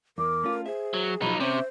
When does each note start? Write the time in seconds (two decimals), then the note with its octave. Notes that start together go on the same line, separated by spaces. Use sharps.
0.18 E2 A#4 D6
0.44 A3 C#4 F4
0.66 G#4 C5 E5
0.94 F#3
1.22 B1 F3 F#3 D#4 F4 B5
1.40 C3 C#4 C5 C#5 E5